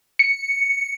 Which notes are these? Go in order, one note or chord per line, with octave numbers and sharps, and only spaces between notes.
C#7